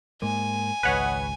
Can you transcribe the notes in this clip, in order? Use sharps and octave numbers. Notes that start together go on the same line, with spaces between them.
G#2 G#3 A#3 G#5
G#1 C#2 B4 C#5 D#5 F#5